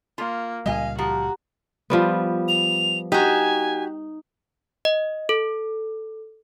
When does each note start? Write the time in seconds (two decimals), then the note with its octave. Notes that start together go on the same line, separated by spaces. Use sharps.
0.18 A#3 F4
0.66 C#2 A#2 G3 D#5 F5 G#5
0.98 F3 F#4 G4 A#5
1.90 F3 G3 B3
2.48 F7
3.12 D#4 F#4 G4 G#5
4.85 D#5
5.29 A4